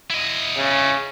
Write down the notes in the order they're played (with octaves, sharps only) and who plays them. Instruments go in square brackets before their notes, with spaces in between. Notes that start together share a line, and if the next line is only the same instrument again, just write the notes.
[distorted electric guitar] E4 D#5
[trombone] C#3